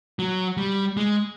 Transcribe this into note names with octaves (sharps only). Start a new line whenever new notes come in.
F#3
G3
G#3